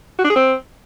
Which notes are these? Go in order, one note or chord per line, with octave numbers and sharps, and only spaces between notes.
F#4
D4
G#4
C4